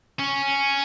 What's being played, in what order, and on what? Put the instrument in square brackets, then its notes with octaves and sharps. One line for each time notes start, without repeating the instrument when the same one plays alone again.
[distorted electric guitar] C#4